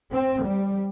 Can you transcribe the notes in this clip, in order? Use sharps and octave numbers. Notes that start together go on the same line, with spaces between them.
C4
G3